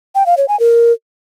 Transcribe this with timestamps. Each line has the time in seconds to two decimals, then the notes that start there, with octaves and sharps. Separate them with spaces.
0.15 G5
0.26 F5
0.37 C#5
0.48 G#5
0.60 A#4